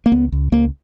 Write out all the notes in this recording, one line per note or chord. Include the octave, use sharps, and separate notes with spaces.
A#3
C#2 B3
C#2
C#2 A#3